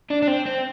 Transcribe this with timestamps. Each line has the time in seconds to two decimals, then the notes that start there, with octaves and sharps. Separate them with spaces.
0.10 D4
0.22 D4
0.28 C4
0.45 C4